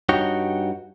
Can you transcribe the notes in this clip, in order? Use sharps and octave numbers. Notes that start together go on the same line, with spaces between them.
G2 D#4 F#4 C#5 G5